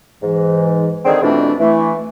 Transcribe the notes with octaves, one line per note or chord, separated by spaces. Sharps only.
G#2 E3
D3 D#3 C4 G#4
F2 B2 E3 A3 C4 D4
E3 A3